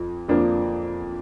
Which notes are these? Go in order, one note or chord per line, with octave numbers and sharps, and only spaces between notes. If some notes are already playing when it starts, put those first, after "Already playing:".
Already playing: F2 F3
F2 F3 A#3 D4